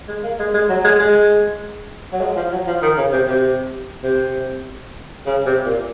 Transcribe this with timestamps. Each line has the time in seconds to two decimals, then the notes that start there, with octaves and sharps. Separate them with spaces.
0.08 G#3
0.23 A#3
0.39 G#3
0.54 G#3
0.69 F#3
0.84 G#3
0.99 G#3
2.13 F#3
2.21 G#3
2.36 F3
2.52 F#3
2.67 F3
2.82 D#3
2.97 C#3
3.12 C3
3.27 C3
4.04 C3
5.26 C#3
5.46 C3
5.65 A#2